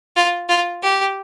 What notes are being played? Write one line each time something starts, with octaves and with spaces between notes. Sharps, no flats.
F4
F4
G4